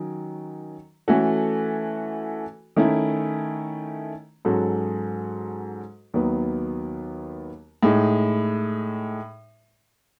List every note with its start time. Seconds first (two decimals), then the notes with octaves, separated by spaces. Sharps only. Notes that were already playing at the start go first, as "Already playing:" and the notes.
Already playing: D#3 F#3 C#4
1.08 E3 A3 C#4 F#4 A4
2.77 D#3 A3 C#4 E4
4.45 G#2 F#3 C#4 F#4 A4
6.14 D#2 D#3 F#3 B3
7.83 A2 G#3 D#4